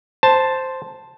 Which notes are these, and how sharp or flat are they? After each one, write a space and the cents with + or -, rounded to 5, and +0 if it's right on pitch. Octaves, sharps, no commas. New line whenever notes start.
C5 +0 A5 +5